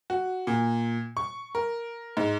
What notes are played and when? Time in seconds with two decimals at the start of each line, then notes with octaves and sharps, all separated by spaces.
0.10 F#4
0.47 A#2
1.17 C#6
1.55 A#4
2.17 G#2